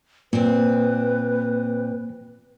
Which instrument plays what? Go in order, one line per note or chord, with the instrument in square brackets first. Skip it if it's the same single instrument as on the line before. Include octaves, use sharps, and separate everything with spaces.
[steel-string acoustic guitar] A#2 C4 [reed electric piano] A#3 [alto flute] B4